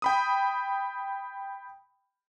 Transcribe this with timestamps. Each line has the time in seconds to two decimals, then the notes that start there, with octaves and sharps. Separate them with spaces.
0.02 G5 B5 D#6